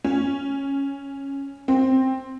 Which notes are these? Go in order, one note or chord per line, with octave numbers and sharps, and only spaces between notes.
C#4
C4